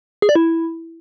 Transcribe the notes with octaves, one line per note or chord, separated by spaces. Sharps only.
G#4
D5
E4